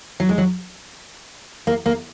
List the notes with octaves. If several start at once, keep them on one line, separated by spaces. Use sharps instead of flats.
F#3
G#3
F#3
A#3
A#3